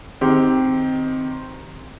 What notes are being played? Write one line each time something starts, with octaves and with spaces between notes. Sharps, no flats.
D#3 C4 G4